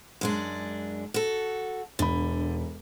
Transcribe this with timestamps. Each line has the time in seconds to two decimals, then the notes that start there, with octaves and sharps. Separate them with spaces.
0.21 F#2 G#3 D4
1.14 F#4 A4
1.99 E1 D3 B5